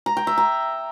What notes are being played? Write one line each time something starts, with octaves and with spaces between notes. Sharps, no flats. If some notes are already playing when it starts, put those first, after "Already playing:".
A#5
G5
E5
A#5